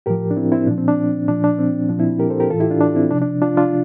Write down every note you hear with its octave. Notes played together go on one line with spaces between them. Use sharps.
A2 F3 G4 A#4
D4
C4 E4
C4 E4
A#2 F3 D4
C4
D4
A#2 F3 D4
D4
C4
A#2 F3 D4
C4 E4
G4 A#4
A4 C5
G4 A#4
A2 E3 F4 A4
E4 G4
D4 F4
D4
C4 E4
C3 F3 D4
D4
D4 F4
D4 F4